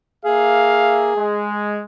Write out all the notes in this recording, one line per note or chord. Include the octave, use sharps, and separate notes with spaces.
A#3 G#4 E5 F5
G#3